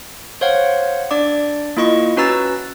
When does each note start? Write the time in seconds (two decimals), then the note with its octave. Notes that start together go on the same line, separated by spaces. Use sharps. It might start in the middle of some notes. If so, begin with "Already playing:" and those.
0.41 C5 C#5 F5 F#5
1.11 D4 D5 D6
1.77 A#3 E4 F4 D#5 C#6
2.17 C#4 F#4 B4 A#5 E6 A6